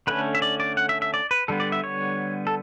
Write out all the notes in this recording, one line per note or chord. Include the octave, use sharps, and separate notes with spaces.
D3 A3 C#4 B4
E5
D5
D5
F#5
E5
E5
D5
B4
D3 G3 B3 A4
D5
E5
C#5
A4